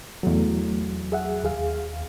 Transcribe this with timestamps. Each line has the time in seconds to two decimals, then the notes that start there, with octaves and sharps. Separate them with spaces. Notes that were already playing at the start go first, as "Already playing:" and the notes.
0.23 E2 F#3 A3
1.12 G#4 E5 F#5
1.43 D#2 G#4 F5